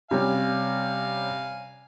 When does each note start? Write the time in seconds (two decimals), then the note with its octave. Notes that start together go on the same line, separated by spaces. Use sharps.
0.11 C3 G3 C#4 F5 G#5